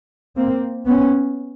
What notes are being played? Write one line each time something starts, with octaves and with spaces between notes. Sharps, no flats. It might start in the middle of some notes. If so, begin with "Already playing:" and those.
A#3 C4
B3 C#4